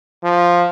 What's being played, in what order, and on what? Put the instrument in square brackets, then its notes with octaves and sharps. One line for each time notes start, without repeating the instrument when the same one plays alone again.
[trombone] F3